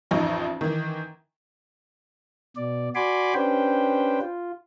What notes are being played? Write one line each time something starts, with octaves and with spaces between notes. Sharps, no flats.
A1 F2 D#4 C#6
D#3 E3
B2 D5
F#4 D5 G#5 B5 C6 D6
C#4 D4 G4 B4 C5 G5
F4